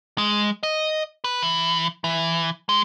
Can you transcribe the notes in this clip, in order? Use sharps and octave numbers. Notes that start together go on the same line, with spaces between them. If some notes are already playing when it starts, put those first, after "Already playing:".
G#3
D#5
B4
E3
E3
G#3